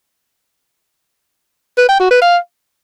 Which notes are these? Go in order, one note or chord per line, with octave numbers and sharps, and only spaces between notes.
B4
G5
F#4
B4
F5